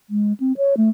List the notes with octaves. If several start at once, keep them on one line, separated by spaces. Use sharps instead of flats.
G#3
C4
C#5
A3